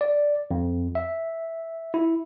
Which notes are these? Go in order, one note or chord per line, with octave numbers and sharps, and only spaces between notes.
D5
F2
E5
E4